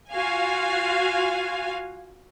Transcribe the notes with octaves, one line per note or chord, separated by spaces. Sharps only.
F4 F#4 F5 G#5